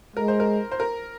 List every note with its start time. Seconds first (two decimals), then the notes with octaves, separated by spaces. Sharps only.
0.16 G#3 A#4
0.28 C5
0.40 A#4
0.72 C5
0.80 A#4